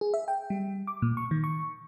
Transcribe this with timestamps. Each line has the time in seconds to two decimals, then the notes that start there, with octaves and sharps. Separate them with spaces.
0.01 G#4
0.14 E5
0.28 G5
0.50 G3
0.87 D6
1.02 A#2
1.17 C#6
1.31 D#3
1.44 C#6